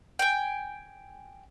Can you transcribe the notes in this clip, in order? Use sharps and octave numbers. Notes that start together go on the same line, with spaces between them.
G5 G#5